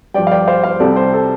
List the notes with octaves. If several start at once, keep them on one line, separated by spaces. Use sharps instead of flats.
G2 F3 D5 G5
F5
D5 G5
C5 F5
C5 F5
C2 C3 G3 A4 D5
C5
A4